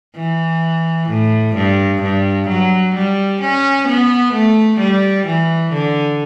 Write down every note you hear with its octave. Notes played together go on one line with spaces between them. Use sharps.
E3
A2
G2
G2
F#3
G3
C#4
B3
A3
G3
E3
D3